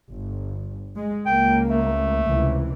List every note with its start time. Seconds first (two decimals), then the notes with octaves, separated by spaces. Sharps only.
0.11 G1
0.96 G#3
1.26 C#2 A#3 G5
1.69 A3
2.26 C#2 C3 E3